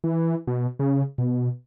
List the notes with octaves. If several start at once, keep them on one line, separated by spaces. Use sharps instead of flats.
E3
B2
C#3
B2